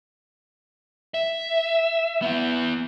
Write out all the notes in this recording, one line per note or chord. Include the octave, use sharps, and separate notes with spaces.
E5
B3 E4